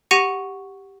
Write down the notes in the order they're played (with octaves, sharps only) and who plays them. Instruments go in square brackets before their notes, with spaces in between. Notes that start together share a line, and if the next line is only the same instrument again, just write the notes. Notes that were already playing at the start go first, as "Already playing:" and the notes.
[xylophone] G4 F#5 C#6 A#6 C#7 D#7